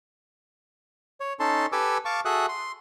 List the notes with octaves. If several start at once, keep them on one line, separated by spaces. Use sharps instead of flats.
C#5
C#4 D#4 A4 A5 C6
G4 A4 B4 G#5 D6 E6
F5 A5 C#6 D6
F#4 G#4 A4 E5 D#6 F#6
C6